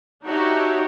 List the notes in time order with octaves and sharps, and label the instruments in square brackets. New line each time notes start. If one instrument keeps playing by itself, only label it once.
[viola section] D4 D#4 F#4 G4 C#5 E5